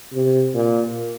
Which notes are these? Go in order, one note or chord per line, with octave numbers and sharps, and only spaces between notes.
C3
A#2